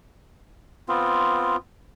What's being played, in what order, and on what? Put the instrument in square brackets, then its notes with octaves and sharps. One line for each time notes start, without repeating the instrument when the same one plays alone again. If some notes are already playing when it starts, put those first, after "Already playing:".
[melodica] B3 C4 F4